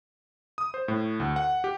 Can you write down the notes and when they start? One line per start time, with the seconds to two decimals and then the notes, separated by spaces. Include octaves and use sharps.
0.58 D#6
0.74 C5
0.88 A2
1.20 D2
1.36 F#5
1.64 G4